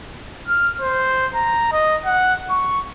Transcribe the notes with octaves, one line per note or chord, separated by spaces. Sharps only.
F6
C5
A#5
D#5
F#5
C#6